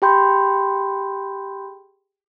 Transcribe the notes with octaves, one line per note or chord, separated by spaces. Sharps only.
G4 G#4 G5 B5 C6 G6